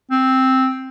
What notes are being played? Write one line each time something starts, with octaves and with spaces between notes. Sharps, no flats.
C4